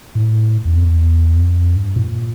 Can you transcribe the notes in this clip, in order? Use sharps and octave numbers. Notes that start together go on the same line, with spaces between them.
A2
E2
F2
E2
F2
G2
A#2